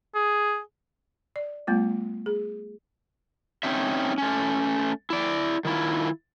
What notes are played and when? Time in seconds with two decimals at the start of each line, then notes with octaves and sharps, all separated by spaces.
0.15 G#4
1.36 D5
1.67 G3 A3 B3 F4
2.26 G#4
3.63 C4 C#4 D#4 E5
4.18 A3 C#4
5.10 E4 D5
5.65 D#3 E4 F4